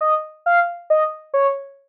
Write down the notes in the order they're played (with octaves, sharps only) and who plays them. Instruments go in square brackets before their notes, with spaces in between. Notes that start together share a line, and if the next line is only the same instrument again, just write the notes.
[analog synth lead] D#5
F5
D#5
C#5